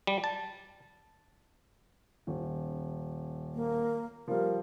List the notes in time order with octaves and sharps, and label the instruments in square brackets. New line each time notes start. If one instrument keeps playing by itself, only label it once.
[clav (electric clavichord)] G3
A5
[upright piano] D#1
[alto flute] A#3
[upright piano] F3 G3 [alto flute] A#4